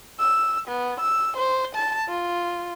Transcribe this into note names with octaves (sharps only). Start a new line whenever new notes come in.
E6
B3
E6
C5
A5
F4